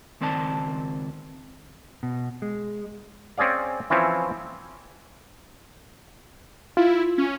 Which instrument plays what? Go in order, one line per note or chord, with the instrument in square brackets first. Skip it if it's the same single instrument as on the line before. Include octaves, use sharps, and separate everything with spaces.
[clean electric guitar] C#2 D#3 C4 C5 D5 A5
[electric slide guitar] B2
G#3
[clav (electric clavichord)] C4 C#4 G#4 D5 F5
E3 F3 C4 C#4 E4
[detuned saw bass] E4 [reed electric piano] F4
[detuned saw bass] C#4